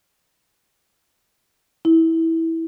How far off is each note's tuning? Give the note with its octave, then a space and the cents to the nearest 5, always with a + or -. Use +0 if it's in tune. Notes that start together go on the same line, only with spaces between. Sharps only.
E4 -15